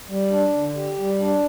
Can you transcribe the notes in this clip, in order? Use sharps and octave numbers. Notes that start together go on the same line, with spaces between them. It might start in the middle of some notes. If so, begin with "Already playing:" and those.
G3
D4
D3
G4
G3
D4